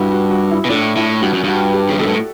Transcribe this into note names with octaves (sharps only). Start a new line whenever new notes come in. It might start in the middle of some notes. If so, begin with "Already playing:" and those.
Already playing: G2 E4 F#4
F#4
F#4
E4
B2
A2 D4
A2 E4
G2 F#4
F#2
G2 F#4
G4
C#3
B2 A4
A2